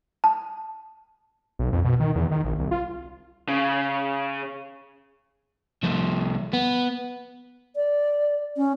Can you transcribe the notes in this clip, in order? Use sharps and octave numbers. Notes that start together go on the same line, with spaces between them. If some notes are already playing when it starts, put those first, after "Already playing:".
A5
B1
F2
B2
D#3
E2
D#3
A#1
C2
F4
C#3
C2 F3
B3
D5
C#4